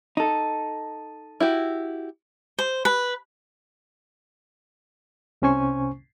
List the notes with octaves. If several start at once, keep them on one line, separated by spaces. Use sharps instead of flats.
D#4 A4
E4 F#4 G4
C5
B4
C2 C3 C#4 C5 G#5 C#6